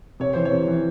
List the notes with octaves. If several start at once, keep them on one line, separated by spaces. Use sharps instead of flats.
C3 C#5
E3 C5
C#5
C3
E3